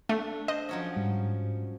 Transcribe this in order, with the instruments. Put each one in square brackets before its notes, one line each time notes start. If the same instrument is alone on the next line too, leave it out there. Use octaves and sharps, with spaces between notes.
[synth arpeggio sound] A3 [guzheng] D4
[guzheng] C5 [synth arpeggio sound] D#5
[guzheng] F3 F#3 C#4
[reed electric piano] G#2 [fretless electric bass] G3